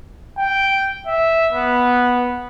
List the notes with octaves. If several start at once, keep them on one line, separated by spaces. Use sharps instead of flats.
G5
E5
B3